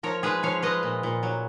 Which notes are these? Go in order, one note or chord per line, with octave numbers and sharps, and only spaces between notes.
F3 A#4 C#5
G#3 G#4 B4
F3 C#5 F5
G#3 B4 D#5
A#2
A#2
F#3